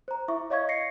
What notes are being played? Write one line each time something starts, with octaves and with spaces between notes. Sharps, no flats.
C5 A#5
E4 E5 C#6 D6
C#5 D#5 F5 C#6 G#6
A#6 C7 C#7